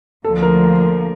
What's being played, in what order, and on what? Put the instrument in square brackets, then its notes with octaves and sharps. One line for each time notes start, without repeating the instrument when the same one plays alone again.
[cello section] D2 D3 F3 A#3 [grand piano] A4
[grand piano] A#4